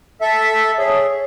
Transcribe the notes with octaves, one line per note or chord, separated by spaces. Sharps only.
A4 E5
G#4 C#5